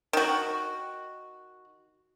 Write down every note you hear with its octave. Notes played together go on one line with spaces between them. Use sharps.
D#3 F#4